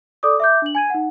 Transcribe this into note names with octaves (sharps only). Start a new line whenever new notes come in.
A4 D5 D6 D#6
E5 D6 G6
D4 F#7
G#5 G#6 D#7
D#4 F#5